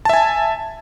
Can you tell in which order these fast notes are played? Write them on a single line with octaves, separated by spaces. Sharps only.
A5 E5 G#5